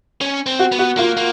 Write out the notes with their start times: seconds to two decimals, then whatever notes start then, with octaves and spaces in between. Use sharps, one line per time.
0.21 C#4
0.46 C4
0.59 F#4
0.72 B3
0.79 F#4
0.97 A#3 F4
1.17 A#3